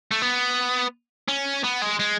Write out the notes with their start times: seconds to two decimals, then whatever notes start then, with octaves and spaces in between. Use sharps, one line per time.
0.11 A3
0.22 B3
1.28 C#4
1.64 B3
1.82 G#3
2.00 G#3